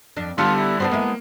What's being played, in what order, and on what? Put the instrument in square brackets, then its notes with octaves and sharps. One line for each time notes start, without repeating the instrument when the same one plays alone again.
[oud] F2 D4
[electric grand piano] D3 G3 [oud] B3 G4 A4 [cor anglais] F4
[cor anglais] E4
[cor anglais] B3 [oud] D4 G4 C5
[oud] G#3 E4 [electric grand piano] A#3